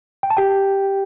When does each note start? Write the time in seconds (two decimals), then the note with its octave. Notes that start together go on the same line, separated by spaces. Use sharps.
0.23 G5
0.30 A5
0.37 G4 G5